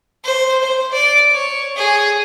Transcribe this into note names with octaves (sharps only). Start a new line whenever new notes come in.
C5
C5
D5
C#5
G#4